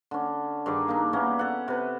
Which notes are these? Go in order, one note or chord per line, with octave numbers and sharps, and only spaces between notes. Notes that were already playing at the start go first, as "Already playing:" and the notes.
D3 C#4
G2 D#3 G#4 D5
A#3 D4 D#4
A#3 B3 C#4 E4
A4 F#5
C3 B4